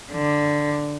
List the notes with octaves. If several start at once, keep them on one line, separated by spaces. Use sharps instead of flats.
D3